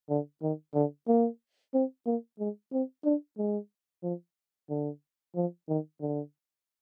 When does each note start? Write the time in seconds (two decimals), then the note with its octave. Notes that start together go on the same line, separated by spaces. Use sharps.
0.09 D3
0.42 D#3
0.74 D3
1.08 A#3
1.74 C4
2.06 A#3
2.39 G#3
2.72 C4
3.05 D4
3.38 G#3
4.03 F3
4.69 D3
5.35 F3
5.68 D#3
6.01 D3